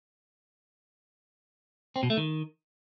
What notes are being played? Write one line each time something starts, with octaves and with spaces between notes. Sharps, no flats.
C4
B2
A3
D#3